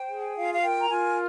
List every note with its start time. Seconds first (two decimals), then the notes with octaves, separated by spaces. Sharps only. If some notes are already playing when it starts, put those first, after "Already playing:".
Already playing: C5 G5
0.08 G#4
0.35 F4 F5
0.53 F5
0.62 A#4 G5
0.80 A#5
0.89 F4 G#5